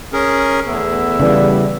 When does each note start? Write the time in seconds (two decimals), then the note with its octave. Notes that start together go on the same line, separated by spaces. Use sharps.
0.13 C#4 G#4 A#4
0.68 E2 A3 B3 E5
1.20 C#3 E3 G3 D5